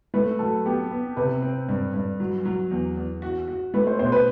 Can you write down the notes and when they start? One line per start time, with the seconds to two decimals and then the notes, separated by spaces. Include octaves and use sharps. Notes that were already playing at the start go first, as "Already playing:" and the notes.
0.14 A3 B4
0.39 F#3 A4
0.66 B3 G4
0.91 B3
1.17 C3 B4
1.42 C4
1.69 G2
1.94 G2
2.20 F#3
2.45 F#3
2.71 E2
2.97 E2
3.22 F#4
3.48 F#4
3.74 A3 B4
3.87 C5
3.99 B2 C5
4.12 B4